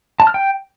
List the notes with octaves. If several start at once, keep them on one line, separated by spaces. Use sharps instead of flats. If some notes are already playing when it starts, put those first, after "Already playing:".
A5
F6
G5